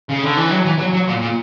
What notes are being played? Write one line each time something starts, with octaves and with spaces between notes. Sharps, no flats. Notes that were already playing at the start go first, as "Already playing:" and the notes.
C#3
D3
E3
F#3
E3
F#3
F#3
A#2
A#2